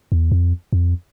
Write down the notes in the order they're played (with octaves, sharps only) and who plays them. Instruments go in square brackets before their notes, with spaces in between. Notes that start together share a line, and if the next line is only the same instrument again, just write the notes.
[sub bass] E2
F2
F2